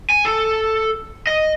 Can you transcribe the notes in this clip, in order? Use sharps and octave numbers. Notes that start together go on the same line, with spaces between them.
G#5
A4
D#5